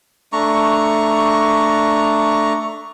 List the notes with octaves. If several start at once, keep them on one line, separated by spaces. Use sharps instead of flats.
A3 D4 A#5 C#6